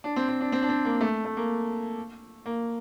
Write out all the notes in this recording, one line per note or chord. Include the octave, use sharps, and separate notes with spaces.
D4
C4
C4
D4
C4
D4
C4
A#3
A3
A3
A#3
A#3